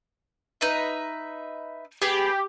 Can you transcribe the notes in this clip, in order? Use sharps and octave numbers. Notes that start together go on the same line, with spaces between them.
D#4 B4 E5
B3 G4 G#4